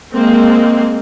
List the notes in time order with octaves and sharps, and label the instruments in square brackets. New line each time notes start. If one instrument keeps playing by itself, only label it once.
[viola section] G#3 A#3 C4